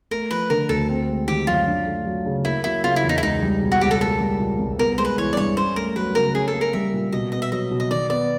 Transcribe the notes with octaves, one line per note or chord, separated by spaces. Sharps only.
A3 A#4
F3 B4
D3 A#4
D2 A4
C4
G#3
D#3 G4
F#2 F4
D4
A3
F#3
C#3
A#3 E4
F#3 E4
C#3 F4
E4
E2
D#4
E4
C#2 D#4
G3
B2
F#4
C#2 G4
A4
A#3 A4
G3
A#2
C2
B3 A#4
G#3 C5
B4
E3 C#5
D5
G2 C#5
C#4 C5
A3 A#4
F#3 B4
C#3 A#4
C#4 G#4
A4
A#3
A#4
G3 E5
A#2
B2 D#5
B3 D#5
E5
F#3 D#5
B2
D#5
D#3 D5
B3 D5